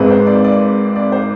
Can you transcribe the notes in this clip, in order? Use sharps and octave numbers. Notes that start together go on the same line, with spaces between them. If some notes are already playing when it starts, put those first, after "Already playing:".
Already playing: G#1 G#2 G#3 C4 B4
C5
D5
D5
D5
C5